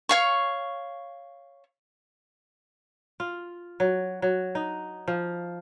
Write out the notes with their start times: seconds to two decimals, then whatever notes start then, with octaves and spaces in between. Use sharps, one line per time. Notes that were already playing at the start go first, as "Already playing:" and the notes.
0.09 C#5 F5 C#6
3.20 F4
3.80 F#3
4.22 F#3
4.55 D#4
5.08 F3